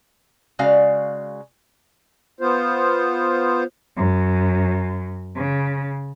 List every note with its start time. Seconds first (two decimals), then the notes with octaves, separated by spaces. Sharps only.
0.59 C#3 G#3 F#4 D5 F5
2.41 B3 F4 C5
3.97 F#2
5.37 C#3